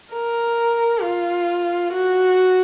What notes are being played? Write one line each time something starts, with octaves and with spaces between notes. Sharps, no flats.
A#4
F4
F#4